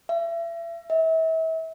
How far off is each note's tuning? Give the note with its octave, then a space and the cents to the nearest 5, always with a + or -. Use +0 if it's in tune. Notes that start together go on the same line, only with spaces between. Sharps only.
E5 +35
E5 -35